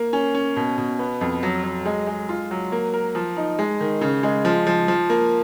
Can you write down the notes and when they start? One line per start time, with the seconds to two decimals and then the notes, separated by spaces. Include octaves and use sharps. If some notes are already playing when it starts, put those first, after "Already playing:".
Already playing: A#3
0.13 C#4
0.35 C#4
0.56 B2
0.78 B2
0.99 B3
1.21 F2
1.43 F#3
1.64 F#3
1.86 G#3
2.07 G#3
2.29 F4
2.51 F#3
2.72 A#3
2.94 A#4
3.15 F3
3.37 D#4
3.59 G#3
3.81 D#3
4.01 C#3
4.23 G#3
4.45 F3
4.67 F3
4.88 F3
5.10 A#3